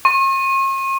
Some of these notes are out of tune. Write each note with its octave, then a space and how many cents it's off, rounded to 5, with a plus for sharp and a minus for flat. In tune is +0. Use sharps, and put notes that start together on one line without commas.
C#6 -45